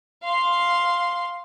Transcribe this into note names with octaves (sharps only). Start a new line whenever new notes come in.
F5 C6